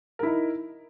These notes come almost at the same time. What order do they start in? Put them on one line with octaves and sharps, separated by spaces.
A#4 E4 D#4